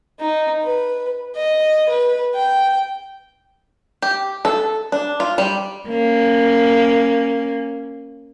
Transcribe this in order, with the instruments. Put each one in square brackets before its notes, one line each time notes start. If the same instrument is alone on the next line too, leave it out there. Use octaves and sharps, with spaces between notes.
[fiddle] D#4
B4
D#5
B4
G5
[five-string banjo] G4
A4
D4
F4
G3
[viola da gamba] A#3 C#4